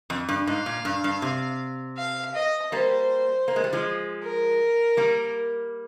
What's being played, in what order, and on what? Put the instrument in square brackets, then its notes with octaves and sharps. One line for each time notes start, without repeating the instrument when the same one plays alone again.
[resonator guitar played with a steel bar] F2
G2
[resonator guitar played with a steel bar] G#2 [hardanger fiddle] F5
[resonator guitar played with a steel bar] A#2
G2
G2
C3
[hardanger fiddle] F5
D#5
[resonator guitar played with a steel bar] G3 A#3 [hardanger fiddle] C5
[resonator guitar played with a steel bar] A#3
G#3
G3
F3 G#3
[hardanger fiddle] A#4
[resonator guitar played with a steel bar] G3 A#3